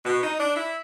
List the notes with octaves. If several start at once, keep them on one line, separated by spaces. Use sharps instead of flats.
B2
D#4
D4
E4